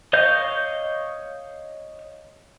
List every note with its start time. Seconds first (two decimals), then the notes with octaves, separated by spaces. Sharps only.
0.13 C#5 D#5 F5 G6